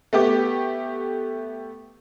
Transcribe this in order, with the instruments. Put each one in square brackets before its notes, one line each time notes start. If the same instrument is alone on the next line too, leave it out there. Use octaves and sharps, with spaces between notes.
[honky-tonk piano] A3 B3 G4 D6